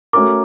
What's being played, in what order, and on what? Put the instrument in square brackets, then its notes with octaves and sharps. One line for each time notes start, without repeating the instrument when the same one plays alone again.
[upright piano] A3 C#4 F#4 A#4 [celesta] D6